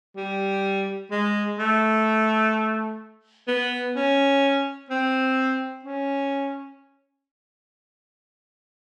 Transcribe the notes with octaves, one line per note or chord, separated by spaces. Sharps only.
G3
G#3
A3
B3
C#4
C4
C#4